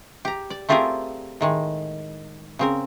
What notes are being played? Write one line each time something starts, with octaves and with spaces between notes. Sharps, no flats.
G4 A#5
D5
A3 C4 F4 G4 G#4 A#4
A2 D#3 G#3
C#3 C4 A#4